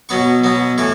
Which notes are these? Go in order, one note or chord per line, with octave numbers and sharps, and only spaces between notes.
B2 F#3 B3 C#6
B2 F#3 B3
A2 E3 C#6